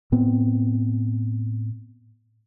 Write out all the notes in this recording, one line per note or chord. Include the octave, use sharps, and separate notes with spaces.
A2 B3 C4